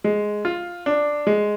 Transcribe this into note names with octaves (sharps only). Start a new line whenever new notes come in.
G#3
F4
D4
G#3